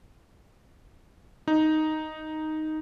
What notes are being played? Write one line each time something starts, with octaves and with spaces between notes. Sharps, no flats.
D#4